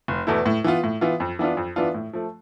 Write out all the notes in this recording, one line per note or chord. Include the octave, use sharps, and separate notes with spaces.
F1
E2 B2 A3 E4
A2
E3 B3 F4
A2
E3 B3 F4
F2
E3 B3 D4 F4
F2
E3 B3 D4 F4
A2
F3 A3